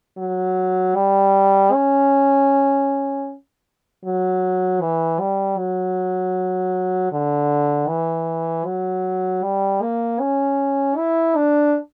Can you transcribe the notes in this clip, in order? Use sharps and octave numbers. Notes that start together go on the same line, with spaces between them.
F#3
G3
C#4
F#3
E3
G3
F#3
D3
E3
F#3
G3
A#3
C#4
E4
D4